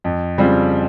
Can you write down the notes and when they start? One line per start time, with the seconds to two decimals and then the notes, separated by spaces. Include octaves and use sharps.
0.04 F2
0.38 C#3 G3 C4 F4